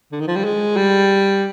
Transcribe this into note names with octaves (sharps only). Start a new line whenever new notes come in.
D3
D#3
F3
G3
G#3
G3